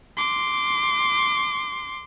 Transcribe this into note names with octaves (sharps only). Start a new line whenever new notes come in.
C6 D6